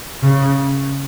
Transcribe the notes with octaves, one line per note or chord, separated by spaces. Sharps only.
C#3